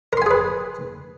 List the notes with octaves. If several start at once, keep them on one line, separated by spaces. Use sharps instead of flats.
G#4 A#4 B4 G#5 C6